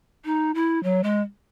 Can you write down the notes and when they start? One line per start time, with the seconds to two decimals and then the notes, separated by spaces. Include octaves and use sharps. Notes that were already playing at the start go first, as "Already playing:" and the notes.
0.25 D#4
0.55 E4
0.83 F#3
1.04 G#3